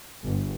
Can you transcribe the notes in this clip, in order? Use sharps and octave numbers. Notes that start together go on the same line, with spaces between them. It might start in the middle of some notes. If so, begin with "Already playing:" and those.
G1